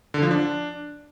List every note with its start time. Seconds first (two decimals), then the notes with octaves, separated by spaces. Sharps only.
0.14 D3
0.22 F3
0.31 D4